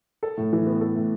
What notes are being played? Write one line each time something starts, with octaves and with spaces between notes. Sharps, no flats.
A4
A2
E3
B3
A4
A2